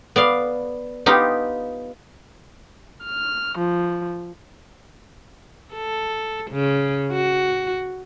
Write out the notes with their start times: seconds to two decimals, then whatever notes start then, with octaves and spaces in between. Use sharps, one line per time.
0.16 B3 D5 F5
1.06 B3 D#4 F4 G4
3.03 F6
3.57 F3
5.74 A4
6.51 C#3
7.12 F#4